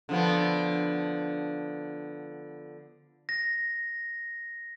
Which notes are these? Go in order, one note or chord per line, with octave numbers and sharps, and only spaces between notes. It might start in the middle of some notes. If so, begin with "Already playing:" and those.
D3 F3 B3
A#6